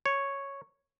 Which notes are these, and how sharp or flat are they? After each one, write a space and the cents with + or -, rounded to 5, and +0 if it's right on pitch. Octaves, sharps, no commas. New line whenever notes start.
C#5 -5